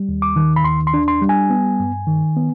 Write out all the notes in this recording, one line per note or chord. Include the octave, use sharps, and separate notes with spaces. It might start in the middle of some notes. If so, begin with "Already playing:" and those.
Already playing: G3
D#2
D6
D#3
B5
D#2 C6
C6
D4
C6
G3
G#5
B3
G2
D#3
B3